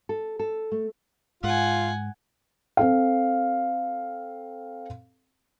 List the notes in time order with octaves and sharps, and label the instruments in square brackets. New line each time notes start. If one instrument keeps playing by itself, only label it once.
[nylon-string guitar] A4
A4
A3
[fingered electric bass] G#2 [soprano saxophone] F4 [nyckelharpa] F#5 G#5
[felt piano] C4 A4 F5